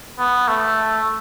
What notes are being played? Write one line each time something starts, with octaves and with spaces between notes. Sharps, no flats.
B3
A3